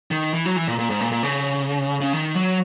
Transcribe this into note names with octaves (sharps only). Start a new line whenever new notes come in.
D#3
E3
F#3
E3
A#2
A#2
G#2
A#2
A#2
C#3
C#3
D#3
F#3